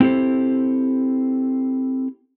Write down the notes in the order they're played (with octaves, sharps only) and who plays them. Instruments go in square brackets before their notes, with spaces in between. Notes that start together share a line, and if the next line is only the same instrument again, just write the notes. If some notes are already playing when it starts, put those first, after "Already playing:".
[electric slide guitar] C4 E4 G4 A4 C5